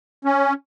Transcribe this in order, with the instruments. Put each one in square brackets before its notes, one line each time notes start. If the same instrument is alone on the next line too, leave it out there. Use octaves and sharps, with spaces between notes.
[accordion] C#4